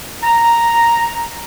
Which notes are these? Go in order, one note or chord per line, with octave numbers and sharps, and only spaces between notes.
A#5